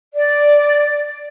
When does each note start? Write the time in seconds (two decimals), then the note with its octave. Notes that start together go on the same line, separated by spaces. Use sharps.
0.14 D5